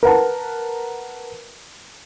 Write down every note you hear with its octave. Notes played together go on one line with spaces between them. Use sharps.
A#4 B4 F#5 A5